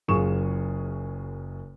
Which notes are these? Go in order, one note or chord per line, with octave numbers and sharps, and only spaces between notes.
F#1 F#2 F4 G#4 C#6 E7